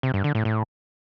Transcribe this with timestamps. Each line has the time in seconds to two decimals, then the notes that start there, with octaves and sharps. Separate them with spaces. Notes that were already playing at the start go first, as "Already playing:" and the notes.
0.03 C3
0.14 G2
0.24 D3
0.35 A2
0.45 A2